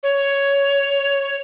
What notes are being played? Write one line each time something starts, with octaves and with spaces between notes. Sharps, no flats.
C#5